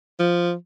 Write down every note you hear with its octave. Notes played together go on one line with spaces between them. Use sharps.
F3